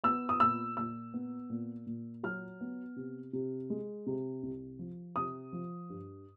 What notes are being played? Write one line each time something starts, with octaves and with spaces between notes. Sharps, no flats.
B3 E6
D#6
A#2 E6
A#2 E6
B3
A#2
A#2
F#3 F6
B3
C3
C3
G#3
C3
C2
F3
C3 D#6
F3
G2